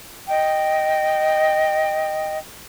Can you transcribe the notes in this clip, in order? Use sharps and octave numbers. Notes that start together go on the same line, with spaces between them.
D#5 G5